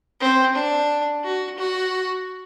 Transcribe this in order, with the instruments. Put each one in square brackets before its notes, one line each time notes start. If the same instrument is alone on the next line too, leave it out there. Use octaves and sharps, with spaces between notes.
[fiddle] C4
D4
F#4
F#4